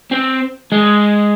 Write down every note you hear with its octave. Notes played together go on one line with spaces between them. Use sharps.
C4
G#3